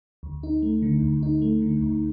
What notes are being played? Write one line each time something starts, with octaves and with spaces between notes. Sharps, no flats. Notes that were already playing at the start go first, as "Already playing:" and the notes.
D2
D#4
A3
D3
D2
D#4
A3
D3
D2